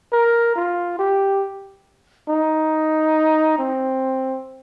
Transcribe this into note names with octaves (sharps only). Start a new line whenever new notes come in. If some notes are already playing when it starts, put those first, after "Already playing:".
A#4
F4
G4
D#4
C4